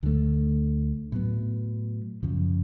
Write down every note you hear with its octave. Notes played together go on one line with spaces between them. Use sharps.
D2 D3 F3 A3
A2 F#3 B3
F#2 C#3 F3